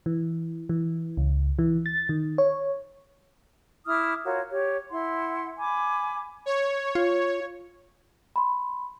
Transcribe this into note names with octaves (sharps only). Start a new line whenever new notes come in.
E3
E3
C#2
E3
A6
D#3
C#5
E4 D6 D#6 F6
F4 F#4 A#4 C#5
G4 C#5
E4 F#5 C6
G#5 B5 D6
C#5
F4
B5 C6